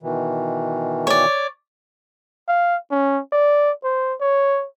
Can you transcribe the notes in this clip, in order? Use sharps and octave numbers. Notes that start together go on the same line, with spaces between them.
B2 D#3 E3
C#5 D5
F5
C#4
D5
C5
C#5